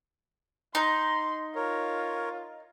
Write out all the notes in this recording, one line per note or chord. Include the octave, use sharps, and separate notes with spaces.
D#4 C6
F4 A#4 C#5